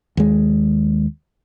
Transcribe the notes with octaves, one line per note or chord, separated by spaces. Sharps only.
D#2 G#3